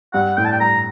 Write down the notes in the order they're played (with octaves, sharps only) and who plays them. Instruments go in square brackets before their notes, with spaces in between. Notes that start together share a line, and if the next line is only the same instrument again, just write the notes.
[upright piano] G2 [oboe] F#5
[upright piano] A2 [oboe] G5
[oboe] A5
G5
[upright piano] G2 [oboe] A#5